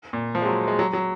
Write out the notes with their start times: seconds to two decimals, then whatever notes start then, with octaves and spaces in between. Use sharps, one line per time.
0.13 A#2
0.35 F3
0.42 G#3
0.46 F#3
0.68 G#3
0.79 F#3
0.93 F#3